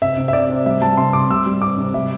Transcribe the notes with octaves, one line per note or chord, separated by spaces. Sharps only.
C3 E5
C3
E5
C3 D5
C3
G3 E5
G3 A5
C3 C6
C3 D6
G3 E6
G3
C3 D6
C3
G3 E5